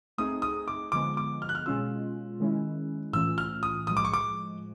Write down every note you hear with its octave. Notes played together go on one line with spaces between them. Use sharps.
A3 C4 D#4 G#4 D#6
D#6
D6
D3 F3 G#3 B3 D6
D6
F6
F#6
F6
B2 G#3 C#4 F4 E6
D#3 G#3 C#4 E4
A2 E3 A3 C#4 F4 E6
F6
D#6
A2 F3 G#3 D#6
D6
C#6
D6